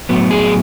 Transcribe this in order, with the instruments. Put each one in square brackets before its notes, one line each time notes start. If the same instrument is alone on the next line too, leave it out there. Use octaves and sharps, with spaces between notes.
[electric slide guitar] A2 F#3 B3
G#4